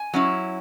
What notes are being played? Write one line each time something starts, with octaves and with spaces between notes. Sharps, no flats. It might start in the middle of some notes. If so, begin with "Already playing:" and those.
Already playing: G#5
F#3 C#4 E4